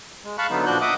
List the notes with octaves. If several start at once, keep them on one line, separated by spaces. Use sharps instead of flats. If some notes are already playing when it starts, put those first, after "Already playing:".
G#3
F5 A5 B5 C#6 F#6
D3 F#3 B3 D#4
A#2 F3 D4 F#4 F#6 G6
D#5 E5 F#5 D6 D#6